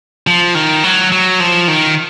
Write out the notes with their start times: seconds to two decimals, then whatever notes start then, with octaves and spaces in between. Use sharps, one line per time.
0.27 F3
0.55 D#3
0.84 F#3
1.12 F#3
1.40 F3
1.68 D#3